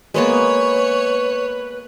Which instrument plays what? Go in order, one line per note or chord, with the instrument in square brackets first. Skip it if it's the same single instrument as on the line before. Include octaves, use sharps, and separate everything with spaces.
[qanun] G#3 A#3 B3 [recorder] B4 [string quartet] C#5